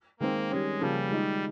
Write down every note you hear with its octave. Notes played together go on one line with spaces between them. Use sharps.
D#3 G#3 A#3 C4
D#3 G3 G#3 C#4 G4
C#3 F3 G3 A#3 C#4 G#4
D#3 G#3 D#4